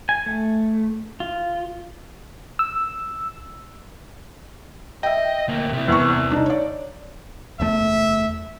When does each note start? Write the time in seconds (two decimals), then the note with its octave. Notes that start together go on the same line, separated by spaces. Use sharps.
0.09 G#5
0.26 A3
1.20 F4
2.59 E6
5.03 D#5 E5 G5
5.49 D2 A#3
5.73 C3 E4
5.88 E2 C#6
6.31 D4 D#4
6.46 C#5 D5
7.60 F#1 E2 A3 E5